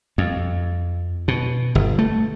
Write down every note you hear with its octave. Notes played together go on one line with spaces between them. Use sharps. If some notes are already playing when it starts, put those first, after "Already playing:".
F2
B2
G1
A3